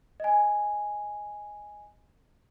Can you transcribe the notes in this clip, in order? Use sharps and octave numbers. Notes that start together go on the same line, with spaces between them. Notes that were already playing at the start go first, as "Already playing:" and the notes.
D#5 G#5